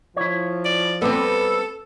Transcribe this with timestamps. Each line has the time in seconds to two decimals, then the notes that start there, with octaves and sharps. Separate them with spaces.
0.17 F3 E4 C#5
0.65 D5
1.02 G3 B3 C4 A4